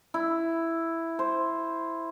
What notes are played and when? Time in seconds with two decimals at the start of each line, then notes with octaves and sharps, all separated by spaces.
0.14 E4
1.19 C5